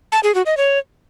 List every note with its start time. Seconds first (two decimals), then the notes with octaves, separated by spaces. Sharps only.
0.12 A5
0.23 G#4
0.35 F#4
0.46 D#5
0.57 C#5